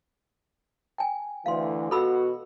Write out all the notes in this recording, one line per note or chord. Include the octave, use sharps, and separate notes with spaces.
G5 G#5
D2 E3 F5 C6
B2 F#4 A4 B5 E6